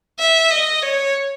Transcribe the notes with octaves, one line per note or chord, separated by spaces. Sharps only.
E5
D#5
C#5